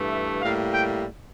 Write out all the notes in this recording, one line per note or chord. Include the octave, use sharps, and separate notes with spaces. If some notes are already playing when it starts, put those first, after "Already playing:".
Already playing: G2 E3 A3
E5
A2 G3 A#3 F5
G5